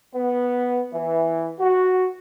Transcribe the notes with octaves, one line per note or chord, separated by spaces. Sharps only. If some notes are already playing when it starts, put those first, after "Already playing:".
B3
E3
F#4